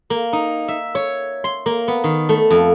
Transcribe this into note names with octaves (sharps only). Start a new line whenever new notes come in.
A#3
D#4
E5
C#5
C6
A#3
B3
D#3
A3
F2